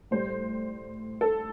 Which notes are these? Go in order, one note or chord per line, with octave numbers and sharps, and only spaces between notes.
A2 G3 C5
A4